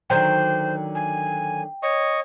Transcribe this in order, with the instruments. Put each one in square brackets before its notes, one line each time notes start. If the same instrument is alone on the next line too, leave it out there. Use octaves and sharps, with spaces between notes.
[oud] D3 D#3 F#3 [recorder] C5 [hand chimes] G5
[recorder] G#5
[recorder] C#5 [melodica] D#5 C#6